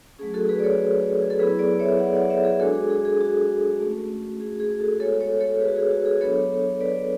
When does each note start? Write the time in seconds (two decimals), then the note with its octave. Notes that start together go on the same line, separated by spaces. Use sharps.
0.19 F#3 A3 C#4 G#4
0.34 F#4 A4
0.49 G#4 B4
0.60 D5
0.64 A4 C#5
1.22 G#4
1.30 A4
1.39 F#3 B3 E4 G#4 B4
1.59 B4 D5
1.79 C#5 E5
1.99 D5 F#5
2.14 D5 F#5
2.29 C#5 E5
2.45 G#4
2.60 G#3 D4 F#4 A4
2.75 G#4
2.90 G#4
3.05 G#4
3.21 F#4
3.80 A3 C#4 F#4
4.40 G#4
4.60 G#4
4.80 F#4 A4
5.00 G#3 B3 F#4 A4 C#5
5.21 A4 C#5
5.41 A4 C#5
5.60 G#4 B4
5.68 F#4
5.76 G#4
5.91 F#4
6.06 G#4
6.21 F#3 B3 D4 A4 C#5
6.81 B4 D5